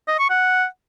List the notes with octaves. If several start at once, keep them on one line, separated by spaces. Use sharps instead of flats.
D#5
C#6
F#5